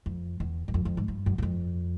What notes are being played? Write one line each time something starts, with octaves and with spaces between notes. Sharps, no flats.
F2
E2
F#2
F2
F2
G#2
G2
F#2
F#2
F2